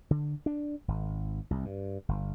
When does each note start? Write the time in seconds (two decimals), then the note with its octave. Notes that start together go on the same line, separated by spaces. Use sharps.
0.11 D3
0.46 D4
0.88 G#1
1.51 C2
1.65 G2
2.09 G1